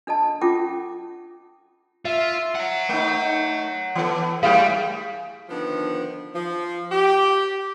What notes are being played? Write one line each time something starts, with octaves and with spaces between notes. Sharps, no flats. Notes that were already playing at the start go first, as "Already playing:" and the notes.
D4 A4 D#5 A5
C#4 F4 A4 G5 D6
F4 E5
C#5 F#5
A3 D#4
E3 B3 A4
G3 A3 E4 G#4 F5
D3 D#3 F3 B3
F3
G4